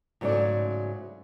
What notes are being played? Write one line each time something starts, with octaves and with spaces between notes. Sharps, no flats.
G#2 C#3 F#3 A3 D5